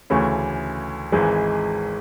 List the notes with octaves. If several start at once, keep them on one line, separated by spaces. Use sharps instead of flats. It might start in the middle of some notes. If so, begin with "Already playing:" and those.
D2 C#3 E3 A3 C#4
G#1 G#2 E3 G#3